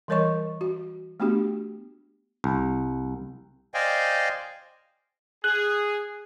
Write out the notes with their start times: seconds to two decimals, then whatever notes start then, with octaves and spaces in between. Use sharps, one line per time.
0.08 E3 G3 A#4 C#5 D#5 C#6
0.61 F#4
1.20 A3 B3 D4 F#4 G4
2.44 C2
3.74 C5 D5 D#5 F5 G5 G#5
5.44 G#4 F#6